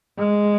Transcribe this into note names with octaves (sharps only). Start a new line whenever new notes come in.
G#3